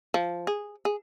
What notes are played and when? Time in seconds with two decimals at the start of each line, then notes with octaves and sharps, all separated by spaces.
0.14 F3
0.47 G#4
0.85 G#4